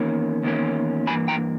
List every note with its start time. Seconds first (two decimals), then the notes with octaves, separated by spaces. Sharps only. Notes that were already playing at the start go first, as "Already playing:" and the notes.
Already playing: E2 D#3 A#3 C#4
0.43 E2 D#3 A#3 C#4
1.07 G2 E3 A#3 G#5 B5
1.28 G5 A#5